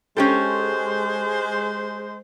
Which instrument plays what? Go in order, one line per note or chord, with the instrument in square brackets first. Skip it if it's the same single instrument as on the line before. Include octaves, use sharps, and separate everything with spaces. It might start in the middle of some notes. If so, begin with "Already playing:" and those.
[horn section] G#3 C5 [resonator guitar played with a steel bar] C#4 G4 A4